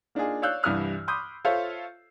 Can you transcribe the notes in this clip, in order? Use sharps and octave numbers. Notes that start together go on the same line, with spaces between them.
A#3 D4 D#4 F4 G#4
C#5 D5 F5 E6 F#6 G6
C2 G2 E3 D#6 F6 F#6
B5 C6 D6 D#6 G6
F4 A4 C5 C#5 E5 F5